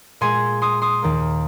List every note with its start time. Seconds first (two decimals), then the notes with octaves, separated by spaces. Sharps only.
0.21 A#2 G#3 G#5 C6
0.62 C6 D#6
0.82 C6 D#6
1.02 D#2 D#3 A#3